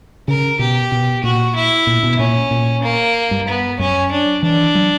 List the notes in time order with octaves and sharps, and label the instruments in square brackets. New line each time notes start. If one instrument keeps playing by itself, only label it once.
[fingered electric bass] C#3 [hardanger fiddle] A#4
[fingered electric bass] B2 [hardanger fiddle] G4
[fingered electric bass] B2
[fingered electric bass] A#2 [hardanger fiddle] F#4
[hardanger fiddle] E4
[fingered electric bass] A#2
B2
[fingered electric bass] A#2 [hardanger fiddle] C#4
[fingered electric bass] A#2
[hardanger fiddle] A#3
[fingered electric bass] G2
[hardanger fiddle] B3
[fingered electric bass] F#2 [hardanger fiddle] C#4
[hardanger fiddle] D4
[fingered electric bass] E3 [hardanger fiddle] D4
[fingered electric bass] F#3